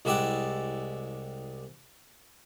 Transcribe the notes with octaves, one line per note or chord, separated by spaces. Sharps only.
C2 G#3 E4 G4 D5 F#5